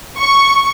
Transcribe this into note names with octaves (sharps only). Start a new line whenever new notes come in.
C#6